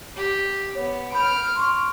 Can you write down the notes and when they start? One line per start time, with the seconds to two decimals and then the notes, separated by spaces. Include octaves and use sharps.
0.16 G4
0.75 B3 C#5
1.12 B5 F6 G6 D7
1.56 C6 C#6